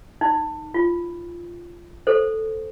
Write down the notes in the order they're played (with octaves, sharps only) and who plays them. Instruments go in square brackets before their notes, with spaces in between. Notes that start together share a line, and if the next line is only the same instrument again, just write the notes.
[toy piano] D#4
F4
A4 C5